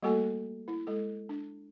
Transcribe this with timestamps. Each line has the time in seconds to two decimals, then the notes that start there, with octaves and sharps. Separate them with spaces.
0.03 G3 A3 A#3 F#4 A4 G#5
0.68 E4
0.87 G#3 A4
1.29 D4